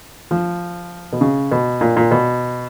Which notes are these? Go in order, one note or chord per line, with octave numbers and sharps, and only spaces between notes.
F3
B2
C#3
B2
A#2
A#2
B2